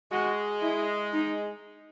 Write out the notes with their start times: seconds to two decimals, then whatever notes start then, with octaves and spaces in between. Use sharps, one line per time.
0.12 G#3 F#4
0.62 E4
1.13 D#4